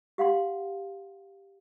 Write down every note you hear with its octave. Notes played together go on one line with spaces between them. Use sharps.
G4 F5 F#5 C6